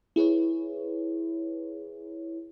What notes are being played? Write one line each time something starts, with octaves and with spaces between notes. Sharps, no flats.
E4 G#4 B4 C#5